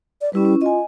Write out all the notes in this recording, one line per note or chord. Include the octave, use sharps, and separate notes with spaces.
D5
G3 C#4 E4 B4
C#4
F4 D#5 G#5